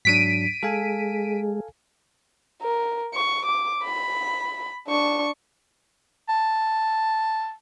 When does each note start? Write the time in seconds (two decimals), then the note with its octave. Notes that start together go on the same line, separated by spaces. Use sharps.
0.05 G#2 F#3 D4 B6 D7 D#7
0.63 G#3 A4 F5 G#5
2.63 A#4
3.14 C#6
3.46 D6
3.84 B5
4.88 D4 C#6
6.29 A5